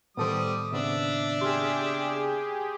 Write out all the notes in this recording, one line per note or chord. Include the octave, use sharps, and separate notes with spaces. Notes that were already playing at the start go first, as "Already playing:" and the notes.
A2 D#3 G3 B3 A4 C5 D#6
C#3 B3 C4 D4 E5
G4 G#4 C6 F6